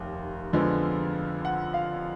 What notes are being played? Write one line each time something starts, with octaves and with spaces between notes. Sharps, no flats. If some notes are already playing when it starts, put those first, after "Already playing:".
Already playing: F1 D#2
F2 D3 F3 G#3 B3
F#5
F5